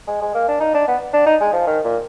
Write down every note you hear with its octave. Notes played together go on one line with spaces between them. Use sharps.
G#3
G#3
A#3
D4
D#4
D4
B3
D4
D#4
G#3
F3
D#3
A#2